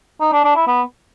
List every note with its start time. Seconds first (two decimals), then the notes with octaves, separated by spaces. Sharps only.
0.21 D#4
0.32 D4
0.44 D4
0.56 E4
0.67 B3